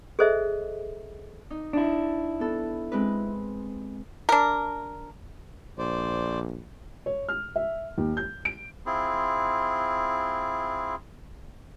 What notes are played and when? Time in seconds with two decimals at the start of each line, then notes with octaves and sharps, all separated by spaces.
0.19 G#4 A4 C5 D#5 E5
1.50 D#4
1.73 D4 E4
2.40 B3 A4
2.92 G#3 C4 B4
4.29 D4 A#4
5.78 A#1 C5 D5
7.06 C#5
7.29 F6
7.56 E5
7.98 D#2
8.17 G6
8.45 D7
8.86 C4 E4 F4 G#4